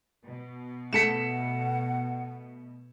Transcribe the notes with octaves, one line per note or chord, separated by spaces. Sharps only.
B2
A3 A4 F#5 B6 C#7 E7